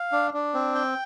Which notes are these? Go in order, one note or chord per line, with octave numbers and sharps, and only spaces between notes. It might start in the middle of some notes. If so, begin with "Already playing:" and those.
Already playing: F5
D4
D4
C4
G5